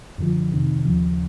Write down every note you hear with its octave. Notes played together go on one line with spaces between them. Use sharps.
F#2 D3 F3
F2 C3 D#3
D#2 C#3 F3